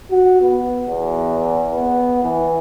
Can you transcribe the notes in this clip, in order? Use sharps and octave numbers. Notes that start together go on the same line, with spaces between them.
F#4
B3
E2
B3
E3